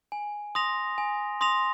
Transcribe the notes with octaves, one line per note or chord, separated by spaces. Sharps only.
G#5
C6 D#6 A#6 F7
G#5
C6 D#6 A#6 F7